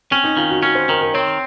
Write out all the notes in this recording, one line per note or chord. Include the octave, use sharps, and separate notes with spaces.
C4 C#4
D#4
D#3 F4
F#4
C#4 F#4
C5
D#3 A#4
A#4
C4 C#5